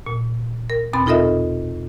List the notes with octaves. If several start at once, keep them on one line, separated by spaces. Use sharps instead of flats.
A#2
A#4
E2 B2 C4 B5 A6
D#4 F4 A4 A#4 D#5 E5